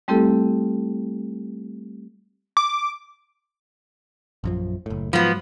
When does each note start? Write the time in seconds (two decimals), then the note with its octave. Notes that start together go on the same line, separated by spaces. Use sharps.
0.08 G3 A3 C4 E4 G4 A4
2.57 D6
4.44 A#1 F#2 F3
4.86 F#1 A2
5.13 G#2 F3 F#3 B3